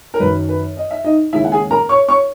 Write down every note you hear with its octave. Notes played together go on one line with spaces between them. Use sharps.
A#4
F#2 D#3 F#3 B4
B4
D#5
E5
D#4 D#5
D#2 C#3 G#3 E4 E5
F#5
G#4 G#5
A#4 A#5
C#5 C#6
C#5 C#6